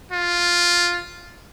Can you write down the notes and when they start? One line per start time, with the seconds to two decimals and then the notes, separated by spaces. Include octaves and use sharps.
0.12 F4